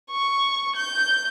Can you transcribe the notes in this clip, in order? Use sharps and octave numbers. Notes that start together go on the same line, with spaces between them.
C#6
G6